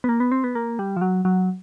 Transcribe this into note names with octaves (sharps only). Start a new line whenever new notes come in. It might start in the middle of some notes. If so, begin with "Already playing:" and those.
B3
A#3
B3
C4
B3
A#3
G3
F3
F#3
F#3